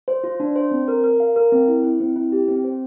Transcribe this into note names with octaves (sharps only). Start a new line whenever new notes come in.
C5
F4
D4
C5
C4
A#4
A#4
F5
A#4
C4
E4
E4
C4
E4
G4
C4
C5